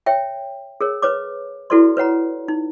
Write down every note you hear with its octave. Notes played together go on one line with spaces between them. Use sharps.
C#5 E5 G5
G#4 A#4 C#5
B4 C#5 D6
E4 F#4 A4 B4 D5 C6
B4 C#5 F#5 A#5
D#4